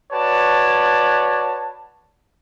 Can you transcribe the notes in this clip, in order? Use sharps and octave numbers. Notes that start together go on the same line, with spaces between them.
F#4 B4 C#5 D5 A5